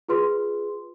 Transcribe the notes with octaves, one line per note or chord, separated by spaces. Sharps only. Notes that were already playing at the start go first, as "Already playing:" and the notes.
F4 G#4 B4 C6